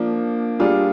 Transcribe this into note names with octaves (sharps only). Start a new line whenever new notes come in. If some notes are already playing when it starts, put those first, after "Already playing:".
Already playing: F3 A#3 D4
G3 A#3 D4 F4 G#4